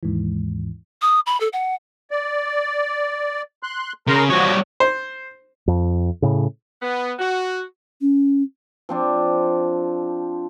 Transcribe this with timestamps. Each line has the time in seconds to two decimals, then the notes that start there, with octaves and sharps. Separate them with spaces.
0.03 D#2 G#2 E3
1.02 D#6
1.26 B5
1.40 A4
1.53 F#5
2.11 D5
3.63 C6 F#6
4.07 C#3 A#4 A#5 C6
4.30 F3 G3 F#4 C#5 D#6
4.80 C5
5.68 F2
6.22 A2 C#3
6.82 B3
7.18 F#4
8.01 C#4
8.89 F3 C4 D4 F4